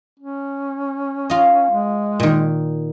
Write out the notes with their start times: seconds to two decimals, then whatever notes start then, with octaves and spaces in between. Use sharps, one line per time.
0.20 C#4
1.30 F4 D#5
1.71 G#3
2.20 A#2 D#3